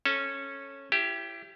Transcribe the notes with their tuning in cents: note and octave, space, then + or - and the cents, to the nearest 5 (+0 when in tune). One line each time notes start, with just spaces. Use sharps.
C#4 -10 A4 +0
E4 +30 G4 +0